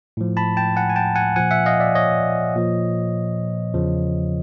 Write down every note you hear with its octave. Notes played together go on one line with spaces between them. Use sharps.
A2 F3
A5 B5
G5 A5
F#5 G#5
G#5
G5 A5
F#5 G#5
A#2 F3 F#5 G#5
E5 F#5
D#5 F5
D5 E5
C#5 D#5
A#2 F3
E2 C#3 F3